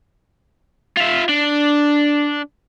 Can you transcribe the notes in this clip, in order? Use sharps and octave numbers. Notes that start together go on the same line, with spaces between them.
F4 E5
D4